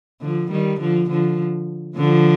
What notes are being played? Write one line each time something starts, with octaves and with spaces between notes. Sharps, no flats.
D3 F3
D#3 G3
D3 F3
D3 F3
D3 F3